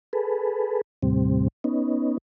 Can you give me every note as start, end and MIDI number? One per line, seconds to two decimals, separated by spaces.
0.13 0.81 68
0.13 0.81 69
0.13 0.81 71
1.03 1.48 39
1.03 1.48 45
1.03 1.48 48
1.03 1.48 55
1.03 1.48 60
1.64 2.18 59
1.64 2.18 61
1.64 2.18 63